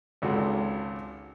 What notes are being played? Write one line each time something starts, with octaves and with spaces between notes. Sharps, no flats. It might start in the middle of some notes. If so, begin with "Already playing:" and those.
G#1 C#2 F#4 A4